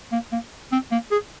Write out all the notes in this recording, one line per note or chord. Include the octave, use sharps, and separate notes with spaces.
A#3
A#3
C4
A#3
G#4